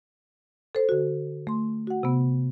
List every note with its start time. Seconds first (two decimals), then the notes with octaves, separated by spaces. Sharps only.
0.75 A4 C5
0.89 D3 F#4
1.47 A3 C6
1.87 F#4 F#5
2.03 C3 B3